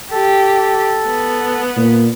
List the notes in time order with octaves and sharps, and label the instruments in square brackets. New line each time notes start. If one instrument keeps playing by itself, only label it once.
[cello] G4 [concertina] A4
[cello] B3
[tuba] A#2